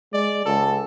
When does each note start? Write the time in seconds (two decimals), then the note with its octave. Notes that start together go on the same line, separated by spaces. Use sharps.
0.13 G#3 D5
0.46 C#2 A4